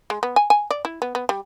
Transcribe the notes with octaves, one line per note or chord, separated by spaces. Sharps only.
G#3
B3
G#5
G#5
D5
E4
B3
B3
G3